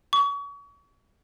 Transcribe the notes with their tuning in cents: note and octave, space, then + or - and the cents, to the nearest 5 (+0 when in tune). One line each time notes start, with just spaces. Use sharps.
C#6 +35